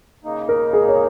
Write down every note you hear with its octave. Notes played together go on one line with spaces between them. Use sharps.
C#3 A#3 D#4
A#4
G#4
C#5